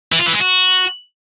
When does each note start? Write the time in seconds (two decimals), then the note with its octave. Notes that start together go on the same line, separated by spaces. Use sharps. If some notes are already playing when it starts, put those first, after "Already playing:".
0.12 E3
0.19 F4
0.26 E3
0.33 G#3
0.41 F#4